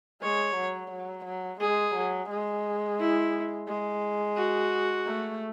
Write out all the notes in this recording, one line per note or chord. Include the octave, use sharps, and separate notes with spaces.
G#3 C#5
F#3
F#3
F#3
G#3 G#4
F#3
G#3
E4
G#3
F#4
A3